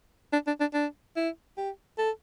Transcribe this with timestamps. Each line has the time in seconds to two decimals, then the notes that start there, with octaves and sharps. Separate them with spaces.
0.33 D4
0.47 D4
0.60 D4
0.74 D4
1.16 E4
1.57 G4
1.98 A4